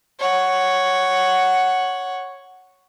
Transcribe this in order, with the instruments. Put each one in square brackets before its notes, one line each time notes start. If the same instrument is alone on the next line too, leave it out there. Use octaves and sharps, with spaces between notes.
[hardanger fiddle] C#5 F#5